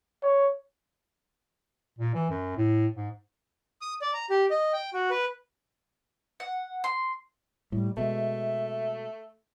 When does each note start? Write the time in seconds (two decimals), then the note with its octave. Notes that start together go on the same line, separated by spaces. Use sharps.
0.23 C#5
1.99 A#2
2.14 E3
2.30 F#2
2.57 A2
2.96 G#2
3.81 D#6
4.02 D5
4.14 A#5
4.30 G4
4.50 D#5
4.73 G5
4.94 F#4
5.10 B4
6.40 F#5
6.84 C6
7.72 A2 G3
7.97 B2 G#3 A3 E5